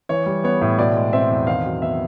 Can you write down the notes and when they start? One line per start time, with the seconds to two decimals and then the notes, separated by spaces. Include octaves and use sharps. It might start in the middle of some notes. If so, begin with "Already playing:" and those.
0.09 E3 C#5
0.26 G3
0.44 B3 C#5
0.61 A2
0.79 B2 D5
0.96 G#3
1.13 C4 E5
1.30 E2
1.47 D#3 F5
1.65 F#3
1.82 B3 E5